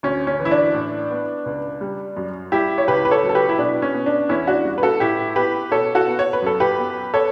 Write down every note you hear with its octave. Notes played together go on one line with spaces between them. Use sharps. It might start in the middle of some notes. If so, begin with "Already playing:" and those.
D2 C#4
C#4
E3
E4
D4
A2
B3
C#2
G3
F#2
G3 E4 G4
C#5
C#2 G4 B4
B4
A4 C#5
F#3
A4
G4 B4
E4
B2 D4
C#4
B3
D4
E2 C#4 E4
D4 F#4
G3
B4
F#4 A4
A2 E4 G4
B3 G4 B4
B2 A4 C#5
F#4 A4
B3
C#5
B4
F#2 A4
G4 B4
B3
A4 C#5